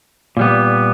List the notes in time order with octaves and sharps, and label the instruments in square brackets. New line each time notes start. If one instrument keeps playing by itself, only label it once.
[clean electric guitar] A#2 G3 B3